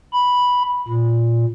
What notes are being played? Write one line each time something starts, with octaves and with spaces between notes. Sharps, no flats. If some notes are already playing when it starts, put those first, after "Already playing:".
B5
A#2